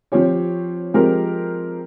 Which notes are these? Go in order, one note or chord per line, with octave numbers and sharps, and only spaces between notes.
F3 C4 G4 C#5
F3 G#3 C4 G4 A#4